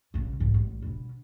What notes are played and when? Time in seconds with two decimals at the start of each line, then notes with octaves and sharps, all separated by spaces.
0.14 A#1 C#3
0.40 B1 G#2
0.54 A1
0.82 B2 D3